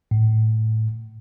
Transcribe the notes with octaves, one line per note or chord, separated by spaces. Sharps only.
A2